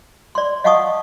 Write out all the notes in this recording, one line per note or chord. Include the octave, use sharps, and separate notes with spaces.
D5 C6
D#5 F5 F#5 A5 C#6 D#6